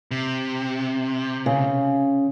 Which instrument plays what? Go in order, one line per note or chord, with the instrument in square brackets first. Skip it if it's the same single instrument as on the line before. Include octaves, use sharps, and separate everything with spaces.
[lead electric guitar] C3
[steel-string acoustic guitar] C#3